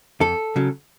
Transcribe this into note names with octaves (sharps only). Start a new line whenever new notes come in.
F2 A4
C#3 F#3